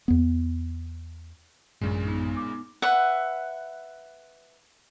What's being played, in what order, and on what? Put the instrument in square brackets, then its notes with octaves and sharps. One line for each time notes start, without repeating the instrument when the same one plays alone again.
[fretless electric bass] E2 B3
[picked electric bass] A1 F#2 D4 [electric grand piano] A#2 C#3 G#3
[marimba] B3 D#4
D6
[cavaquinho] B4 E5 F#5